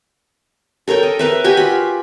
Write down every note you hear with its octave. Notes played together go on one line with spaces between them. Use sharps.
A4 A#4 C#5 G5
D#5
A#4 B4 E5
F#4 G4 G5 G#5
F4 B5